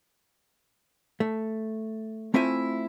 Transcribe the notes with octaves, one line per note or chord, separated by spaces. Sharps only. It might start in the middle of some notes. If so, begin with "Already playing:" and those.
A3
A3 C4 E4 F4 E5 G#5